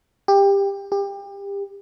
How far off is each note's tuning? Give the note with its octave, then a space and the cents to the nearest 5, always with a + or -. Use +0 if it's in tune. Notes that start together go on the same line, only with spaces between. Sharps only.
G4 +20
G4 +30